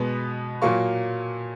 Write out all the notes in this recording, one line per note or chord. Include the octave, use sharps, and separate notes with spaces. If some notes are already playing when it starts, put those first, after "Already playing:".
Already playing: B2 G#3 B3
A#2 F#3 A#3 C#6